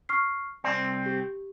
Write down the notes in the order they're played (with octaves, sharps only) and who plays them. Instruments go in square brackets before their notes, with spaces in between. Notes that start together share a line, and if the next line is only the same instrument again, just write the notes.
[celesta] C#6 F6 C7
[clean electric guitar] C2 C4 [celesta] D5
[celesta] G4